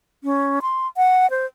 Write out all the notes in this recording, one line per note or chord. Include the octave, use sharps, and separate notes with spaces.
C#4
C6
F#5
C5